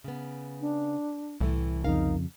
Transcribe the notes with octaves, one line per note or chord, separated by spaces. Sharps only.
C#3 B3
D4
C2 A2 E3 A3
F2 C#3 D#4 A#4 F5